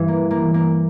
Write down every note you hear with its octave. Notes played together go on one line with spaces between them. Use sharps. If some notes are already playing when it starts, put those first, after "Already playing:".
Already playing: G2 E3 E4
A#3
A#3
A#3